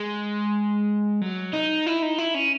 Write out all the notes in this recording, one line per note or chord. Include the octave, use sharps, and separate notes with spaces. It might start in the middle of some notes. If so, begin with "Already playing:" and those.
Already playing: G#3
F#3
D#4
E4
D#4
E4
C#4